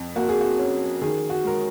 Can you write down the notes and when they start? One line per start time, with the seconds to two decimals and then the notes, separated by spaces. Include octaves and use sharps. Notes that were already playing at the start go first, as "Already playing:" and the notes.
Already playing: F2
0.15 A#3 F#4
0.29 G#4
0.41 F#4
0.59 C#4
1.01 D#3 G#4
1.30 F#4
1.44 G#3 A#4